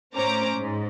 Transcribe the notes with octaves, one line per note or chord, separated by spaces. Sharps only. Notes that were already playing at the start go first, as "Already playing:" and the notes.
A2 C#4 C5 A#5 D6
G#2